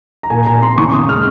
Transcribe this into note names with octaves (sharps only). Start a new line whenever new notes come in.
A#5
A#2 G#5
A#2 A#5
C4 C6
C#3 C#6
C#3 D#6
G#3 F6